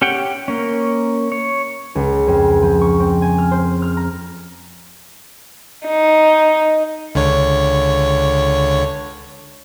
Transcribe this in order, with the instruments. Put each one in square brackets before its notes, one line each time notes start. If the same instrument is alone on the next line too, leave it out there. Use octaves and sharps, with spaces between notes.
[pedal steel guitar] C#4 G4 F#5 G5
A#3 C#4
C#5
[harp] C#2
F2
F3
C#6
C4
G#5
F6
C5
F6
A#5
[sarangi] D#4
[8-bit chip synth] C#2 D3 C#5